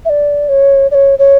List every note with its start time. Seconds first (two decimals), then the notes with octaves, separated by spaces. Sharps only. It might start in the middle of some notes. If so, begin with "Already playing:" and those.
0.05 E5
0.09 D5
0.49 C#5
0.91 D5
0.94 C#5
1.19 C#5